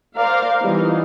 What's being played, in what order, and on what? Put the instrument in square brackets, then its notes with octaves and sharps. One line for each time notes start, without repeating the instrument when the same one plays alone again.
[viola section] A#4 C5 D5 F5 A#5
E3 G3 B3 D#4 F4